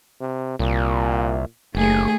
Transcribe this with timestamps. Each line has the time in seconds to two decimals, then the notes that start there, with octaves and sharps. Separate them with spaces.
0.20 C3
0.59 C2 A#2
1.75 F#1 D#2 A3 G#4